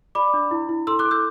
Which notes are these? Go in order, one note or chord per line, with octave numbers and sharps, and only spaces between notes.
D5 B5 D6
D4
E4
E4
A4 C6 E6
D6 F#6
A4
E6 G6